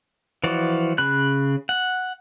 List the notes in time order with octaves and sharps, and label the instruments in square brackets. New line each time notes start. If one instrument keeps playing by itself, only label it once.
[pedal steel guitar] E3 F3 F#4 D5
C#3 B5 F#6
F#5